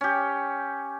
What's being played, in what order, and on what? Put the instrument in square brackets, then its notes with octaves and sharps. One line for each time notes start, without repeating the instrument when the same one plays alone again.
[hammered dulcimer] C#4 G4